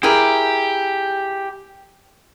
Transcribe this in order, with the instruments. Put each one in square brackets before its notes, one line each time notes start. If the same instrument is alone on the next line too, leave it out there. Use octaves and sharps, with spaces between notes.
[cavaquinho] E4 G#4 A#4 [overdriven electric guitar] G4